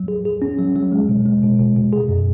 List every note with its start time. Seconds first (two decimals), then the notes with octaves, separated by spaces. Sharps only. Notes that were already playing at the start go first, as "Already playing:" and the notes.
Already playing: F#3
0.08 G#4
0.25 G#4
0.42 C#4
0.59 F#3
0.76 F#3
0.92 G#3
1.09 B2
1.26 G#3
1.43 B2
1.59 B2
1.76 B2
1.93 G#4
2.09 F#2